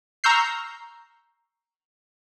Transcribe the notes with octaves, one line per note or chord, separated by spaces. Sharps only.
A#5 C#6 E6 F6 G6 C7